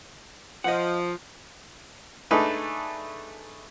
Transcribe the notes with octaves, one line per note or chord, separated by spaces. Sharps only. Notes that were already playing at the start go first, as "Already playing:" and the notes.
F3 D#5 F#5
A3 D4 D#4 G#4 B4